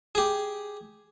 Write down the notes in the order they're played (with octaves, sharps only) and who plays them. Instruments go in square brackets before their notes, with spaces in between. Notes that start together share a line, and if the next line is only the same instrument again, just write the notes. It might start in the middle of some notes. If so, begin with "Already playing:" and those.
[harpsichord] G4 G#4